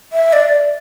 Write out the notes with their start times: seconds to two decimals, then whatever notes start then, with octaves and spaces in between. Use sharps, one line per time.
0.13 E5
0.33 D5